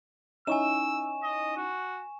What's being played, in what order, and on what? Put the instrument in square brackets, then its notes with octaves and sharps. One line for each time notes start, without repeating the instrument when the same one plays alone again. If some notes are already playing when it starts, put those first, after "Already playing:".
[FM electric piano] C#4 D#4 E4 [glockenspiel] G#5 C#6 E7 [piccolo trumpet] E6
[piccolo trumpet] D#5
F#4